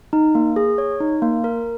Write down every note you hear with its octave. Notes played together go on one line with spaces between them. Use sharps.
D#4
A#3
G#4
C#5
D#4
A#3
A#4